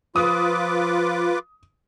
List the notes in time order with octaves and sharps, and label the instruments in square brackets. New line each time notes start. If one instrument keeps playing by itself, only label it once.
[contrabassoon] F3 [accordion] F4 B4 D6 [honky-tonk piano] D#6